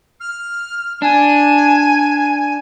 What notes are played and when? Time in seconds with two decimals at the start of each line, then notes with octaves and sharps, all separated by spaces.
0.20 F6
1.02 D4 G#5